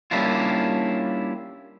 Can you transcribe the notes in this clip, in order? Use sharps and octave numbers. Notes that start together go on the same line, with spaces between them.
G3 A#3 C#4 D4 E4 F4